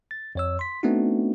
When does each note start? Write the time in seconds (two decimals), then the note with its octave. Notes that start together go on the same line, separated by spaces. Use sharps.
0.11 A6
0.35 F2 C#5 E6
0.59 C6 B6
0.83 A3 B3 C4 D4 D#4 F#4